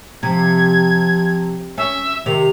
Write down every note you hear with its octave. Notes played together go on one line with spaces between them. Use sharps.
C3 F3 G#6
C#4 E5
C3 D#3 F7